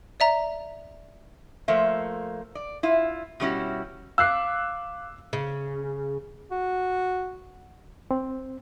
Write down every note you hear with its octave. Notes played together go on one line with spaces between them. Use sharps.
D5 E5 A#5
F3 A3 A#3 C5 E5
D5
E4 F4
B2 F#3 G3 C#4 E4 F#4
F5 D6 E6 F#6 C7
C#3
F#4
C4